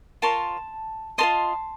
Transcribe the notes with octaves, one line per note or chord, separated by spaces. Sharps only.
F4 A#4 C#5 A5 C6
F4 A#4 D#5 A5 C6